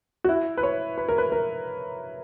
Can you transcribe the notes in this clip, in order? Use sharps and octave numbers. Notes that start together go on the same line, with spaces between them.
F#4
E4
B4
C#5
B4
A#4
B4
A#4